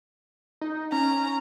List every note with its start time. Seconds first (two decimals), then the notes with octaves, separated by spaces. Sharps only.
0.61 D#4
0.92 C#4 A#5